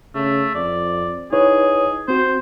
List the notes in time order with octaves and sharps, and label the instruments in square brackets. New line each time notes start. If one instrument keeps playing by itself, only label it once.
[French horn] C#3 [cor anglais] A3
[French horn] F2 [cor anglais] D5
[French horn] D#4 [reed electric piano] E4 B4 C#5 [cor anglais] G#4
[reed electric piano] C4 F#4 [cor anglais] C5